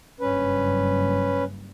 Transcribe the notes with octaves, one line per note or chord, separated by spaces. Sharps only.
F#1 G2 C#4 B4